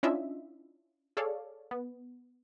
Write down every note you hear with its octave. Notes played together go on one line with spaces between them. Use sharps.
C#4 D4 E4 F4 D#5 E5
G#4 A4 C#5 D5 F5
B3